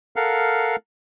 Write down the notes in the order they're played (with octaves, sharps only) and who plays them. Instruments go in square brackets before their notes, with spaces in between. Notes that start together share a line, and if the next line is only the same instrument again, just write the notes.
[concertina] A4 A#4 F5 F#5